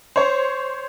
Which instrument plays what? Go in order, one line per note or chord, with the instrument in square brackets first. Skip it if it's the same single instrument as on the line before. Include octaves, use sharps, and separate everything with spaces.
[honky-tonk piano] C5 C#5